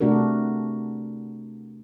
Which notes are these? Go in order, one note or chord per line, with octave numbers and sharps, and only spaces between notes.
C3 A3 D4 F#4 A#4